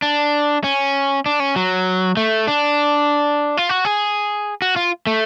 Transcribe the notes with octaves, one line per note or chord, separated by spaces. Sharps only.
D4
C#4
D4
C#4
F#3
A3
D4
F4
F#4
G#4
F#4
F4
A3